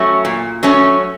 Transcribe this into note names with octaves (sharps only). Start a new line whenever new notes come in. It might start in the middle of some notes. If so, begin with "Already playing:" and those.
Already playing: F#3 A3 C#4
A#2
F#3 A3 C#4